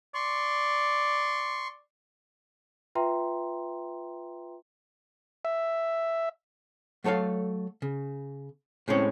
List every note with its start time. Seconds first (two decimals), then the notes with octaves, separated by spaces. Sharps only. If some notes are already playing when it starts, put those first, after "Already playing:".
0.14 D5 C6 C#6
2.95 F4 B4 E5 G5 A#5 C6
5.45 E5
7.04 F#3 A3 A4 C#5 F5
7.82 C#3
8.88 A2 G#3 C4 C#4 C#5